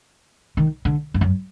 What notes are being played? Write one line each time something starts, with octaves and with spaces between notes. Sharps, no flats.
D#3
D3
G2
F#2